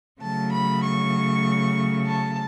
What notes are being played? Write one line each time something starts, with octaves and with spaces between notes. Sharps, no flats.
C#3 F#3 A3 A5
B5
C#6
A5